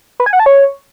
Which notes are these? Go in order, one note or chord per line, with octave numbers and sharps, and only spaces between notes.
B4
G#5
F#5
A5
C#5